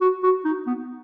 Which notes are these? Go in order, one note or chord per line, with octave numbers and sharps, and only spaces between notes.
F#4
F#4
D#4
B3